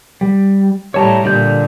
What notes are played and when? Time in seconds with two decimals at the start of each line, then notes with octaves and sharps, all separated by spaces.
0.21 G3
0.94 A2 G3 C#5 A5 A#5
1.25 A#2 D3 D5 G6